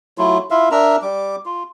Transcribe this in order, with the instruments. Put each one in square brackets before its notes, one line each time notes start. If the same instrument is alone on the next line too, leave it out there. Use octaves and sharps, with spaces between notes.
[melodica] F#3 A3 E4 F4
E4 F4 E5 F5
D4 A#4 E5 A#5
G3 D6
F4